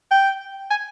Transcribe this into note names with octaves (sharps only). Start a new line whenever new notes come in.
G5
G#5